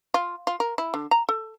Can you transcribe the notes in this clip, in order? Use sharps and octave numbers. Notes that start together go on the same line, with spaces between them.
F4
F4
A#4
E4
D3
A#5
A4